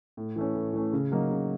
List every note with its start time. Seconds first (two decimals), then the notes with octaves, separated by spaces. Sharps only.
0.17 A2
0.36 E3 A3 C#4
0.55 A2
0.73 E3 A3 C#4
0.93 C#3
1.12 F#3 A#3 D#4
1.31 C#3